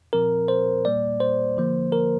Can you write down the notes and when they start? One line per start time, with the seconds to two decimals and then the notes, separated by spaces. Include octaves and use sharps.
0.13 A#2 F3 C4 A#4
0.48 C5
0.85 A#2 G3 A#3 D5
1.20 C5
1.57 D3 F3 A#3
1.92 A#4